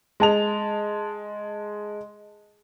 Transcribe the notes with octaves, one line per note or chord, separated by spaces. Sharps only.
G#3 A5 F7